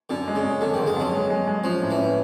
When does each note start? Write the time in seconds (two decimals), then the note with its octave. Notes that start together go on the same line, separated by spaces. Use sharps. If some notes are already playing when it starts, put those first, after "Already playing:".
0.10 F#2 D3
0.28 G#3
0.35 C#3
0.44 F#2
0.61 F2 D3
0.74 G1 D#3
0.86 G#3
0.96 F2 F#3
1.13 G#3
1.30 G#3
1.47 G#3
1.64 F3 C#4
1.82 A2
1.91 E3
1.98 C#4